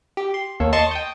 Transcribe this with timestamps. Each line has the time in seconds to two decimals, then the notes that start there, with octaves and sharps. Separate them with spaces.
0.17 G4
0.34 C6
0.60 D#2 A#3 A4 C#5
0.73 D#5 A5 C6 C#6
0.91 G5 D#6 G6